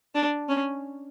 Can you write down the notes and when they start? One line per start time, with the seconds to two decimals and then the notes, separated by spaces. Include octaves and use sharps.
0.15 D4
0.49 C#4